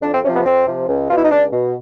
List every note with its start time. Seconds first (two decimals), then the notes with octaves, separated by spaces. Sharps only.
0.01 F2 D4
0.12 C4
0.23 C3 C#4
0.28 F3
0.34 B3
0.45 F2 C4
0.67 C3 F3
0.88 C#2
1.09 B2 F4
1.17 E4
1.23 D#4
1.31 C#2 D4
1.52 B2